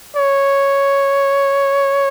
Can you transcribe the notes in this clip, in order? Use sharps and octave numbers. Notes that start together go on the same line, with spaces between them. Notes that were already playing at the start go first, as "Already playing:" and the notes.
C#5